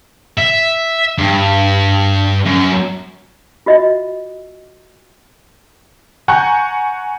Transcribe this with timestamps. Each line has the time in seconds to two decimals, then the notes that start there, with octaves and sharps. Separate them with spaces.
0.38 E5
1.18 G2
2.45 F#2
3.66 F4 F#4 D#5 E5
6.28 F#5 G#5 A#5 C#6 F#6 G6